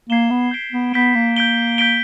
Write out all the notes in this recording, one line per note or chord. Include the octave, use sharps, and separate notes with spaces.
A#3 G#6 C7 E7 G7
B3
G6 B6 D7 G7
B3
B3 G6 B6 D7 G7
A#3
G6 B6 D7 G7
G6 B6 D7 G7